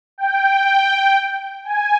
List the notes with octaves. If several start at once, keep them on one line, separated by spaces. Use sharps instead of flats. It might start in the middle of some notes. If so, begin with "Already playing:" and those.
G5
G#5